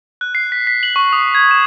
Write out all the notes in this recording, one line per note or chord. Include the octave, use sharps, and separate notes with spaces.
F#6
C7
B6
B6
F#7
C#6
D#6
G#6
E7